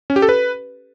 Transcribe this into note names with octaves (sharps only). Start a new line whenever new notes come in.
C#4
G4
A4
B4